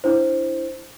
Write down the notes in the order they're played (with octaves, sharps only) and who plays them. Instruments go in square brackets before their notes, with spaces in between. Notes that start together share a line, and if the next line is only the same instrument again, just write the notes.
[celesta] D4 E4 C5